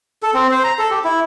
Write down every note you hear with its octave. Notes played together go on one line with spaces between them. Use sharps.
A4
C4
C5
A#5
A4
G4
E4